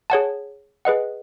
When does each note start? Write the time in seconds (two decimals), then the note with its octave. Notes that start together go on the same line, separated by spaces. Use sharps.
0.10 G#4 C#5 F#5 A5
0.85 G#4 B4 D#5 F#5